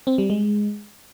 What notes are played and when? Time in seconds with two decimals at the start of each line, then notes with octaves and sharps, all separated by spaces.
0.07 C4
0.18 G3
0.30 G#3